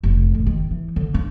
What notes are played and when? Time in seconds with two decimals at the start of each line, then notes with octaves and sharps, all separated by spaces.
0.03 F1
0.34 A2
0.46 D#3
0.71 E3
0.96 D3
1.14 D4